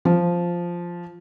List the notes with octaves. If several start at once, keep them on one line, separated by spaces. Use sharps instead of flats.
F3